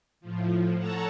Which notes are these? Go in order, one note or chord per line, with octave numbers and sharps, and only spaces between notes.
A2 F3
A4 C#5 F#5 A5 A#5